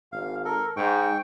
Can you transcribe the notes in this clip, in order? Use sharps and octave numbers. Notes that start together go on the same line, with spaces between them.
G#1 F5
A4 A#4
G#2 G5 C#6